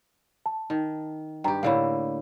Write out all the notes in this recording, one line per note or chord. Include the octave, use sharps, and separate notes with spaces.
A5
D#3
G2 G4 G5 A#5
A2 D3 A#3 F5 B5